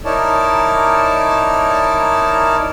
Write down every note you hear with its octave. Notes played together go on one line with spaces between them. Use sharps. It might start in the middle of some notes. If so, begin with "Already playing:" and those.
D#4 E4 A#4 C#5 D5 A5